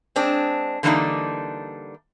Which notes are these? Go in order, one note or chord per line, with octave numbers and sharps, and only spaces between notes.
G#3 C4 D4
D3 E3 G3 A#3 D4 D#4